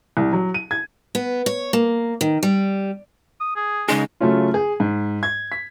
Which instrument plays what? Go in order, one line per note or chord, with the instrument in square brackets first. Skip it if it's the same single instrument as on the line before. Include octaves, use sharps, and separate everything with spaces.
[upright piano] C2
F#3
D#7
G#6
[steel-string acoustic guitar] B3
C#5
A#3
D#3
G3
[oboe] D#6
G#4
[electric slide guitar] C#3 D#4 G#4 [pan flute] G#3
[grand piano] C#3 F#3 A3 C#4 F4
G#4
G#2
G#6
B6